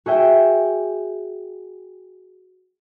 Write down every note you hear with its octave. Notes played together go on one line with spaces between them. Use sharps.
F#4 G#4 E5 G5